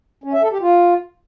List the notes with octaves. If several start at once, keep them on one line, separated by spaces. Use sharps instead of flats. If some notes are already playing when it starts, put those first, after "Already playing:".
C#4
E5
A4
G4
F4